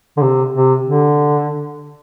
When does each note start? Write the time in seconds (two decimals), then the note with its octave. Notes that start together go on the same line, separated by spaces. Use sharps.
0.17 D3
0.21 C3
0.53 C3
0.84 D3